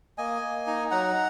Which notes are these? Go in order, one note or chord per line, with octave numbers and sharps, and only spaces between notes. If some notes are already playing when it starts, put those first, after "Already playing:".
A#3 D#5 G#5
A#3
D#4
F#3 F#5 A#5